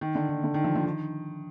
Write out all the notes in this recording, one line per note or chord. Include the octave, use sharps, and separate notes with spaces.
D#3
D3
D#3
D3
D#3
F3
F3
D#3